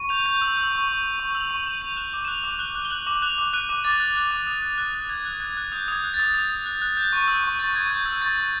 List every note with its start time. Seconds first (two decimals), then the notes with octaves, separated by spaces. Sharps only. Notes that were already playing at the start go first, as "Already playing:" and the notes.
Already playing: C#6
0.09 G6 F7
0.26 G6
0.41 E6
0.57 E6
0.72 C#6
0.88 C#6
1.03 C#6
1.20 C#6
1.31 F7
1.35 E6 F#7
1.50 C#6 D#7
1.66 G6 E7
1.82 G6 F7
1.97 F#6 E7
2.13 D6
2.25 E7
2.28 F#6 F7
2.44 D6
2.59 F#6 G7
2.75 F#6
2.85 G7
2.90 F#6 F#7
3.07 D6
3.22 F#6 F7
3.38 D6
3.53 F#6 D#7
3.69 D6
3.84 D6 A6
4.00 F#6
4.16 F#6
4.31 D6
4.47 D#6
4.62 F#6
4.78 F#6
4.94 F#6
5.09 F#6 G#6
5.25 F#6
5.40 F#6 G#6
5.57 F#6
5.72 D#6 G6
5.88 D#6 G#6
6.04 F#6
6.14 A6
6.19 D#6
6.34 D#6
6.49 D#6
6.66 F#6
6.82 F#6
6.97 G6
7.13 C#6
7.28 E6
7.44 C#6
7.59 C#6 A6
7.75 C#6 G#6
7.90 C#6 G6
8.06 E6 G#6
8.22 C#6 A6
8.37 C#6